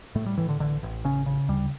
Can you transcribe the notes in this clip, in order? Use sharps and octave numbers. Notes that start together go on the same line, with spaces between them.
A2 A3
G3
A2 E3
D3
A1 D3
A1
C#3 C#4
C#3
D2 G3